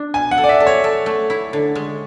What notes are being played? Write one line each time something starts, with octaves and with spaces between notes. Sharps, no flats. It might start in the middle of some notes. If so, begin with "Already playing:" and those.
Already playing: D4
B2 G#5
F#5
A4
D5
E5
A4
C#5
A4
A3
E4
D3
G#3